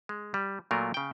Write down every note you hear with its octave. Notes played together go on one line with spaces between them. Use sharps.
G#3
G3
A#2 F#3 A3 F4 A#4
C#3 G5